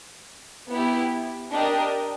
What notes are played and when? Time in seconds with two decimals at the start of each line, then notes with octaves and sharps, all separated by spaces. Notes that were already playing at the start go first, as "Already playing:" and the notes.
0.69 B3 E4 G4
1.51 D4 G4 A#4 D#5